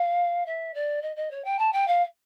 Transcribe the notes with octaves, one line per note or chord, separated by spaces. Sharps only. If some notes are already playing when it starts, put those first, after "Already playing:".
Already playing: F5
E5
D5
D#5
D#5
C#5
G5
A5
G5
F5